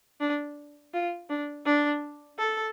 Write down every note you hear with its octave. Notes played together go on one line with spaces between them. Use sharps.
D4
F4
D4
D4
A4